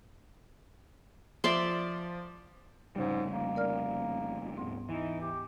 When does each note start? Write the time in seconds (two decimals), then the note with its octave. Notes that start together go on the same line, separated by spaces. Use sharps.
1.44 F3 D5 E5 C6
2.96 F1 G#2 C#3 G3
3.29 A#3
3.56 A#4 D5 F6
4.56 D2 G#2 B3
4.89 E3 D#4
5.22 G4